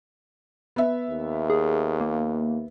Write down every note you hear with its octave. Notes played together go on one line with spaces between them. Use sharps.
B3 E5
D#2
G#4
A#3